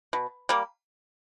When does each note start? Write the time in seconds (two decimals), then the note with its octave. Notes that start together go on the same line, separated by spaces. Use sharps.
0.13 B2
0.49 G3 A#3